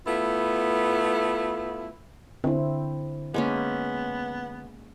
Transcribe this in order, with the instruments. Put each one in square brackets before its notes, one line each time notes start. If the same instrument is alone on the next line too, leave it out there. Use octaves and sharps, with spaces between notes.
[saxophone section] A3 B3 E4 F4
[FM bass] D3 [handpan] C4 E4
[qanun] G#3 A#3 C#4 [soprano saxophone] B3